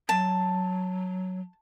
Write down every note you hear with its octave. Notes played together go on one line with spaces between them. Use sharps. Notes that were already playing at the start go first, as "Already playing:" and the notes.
F#3 A5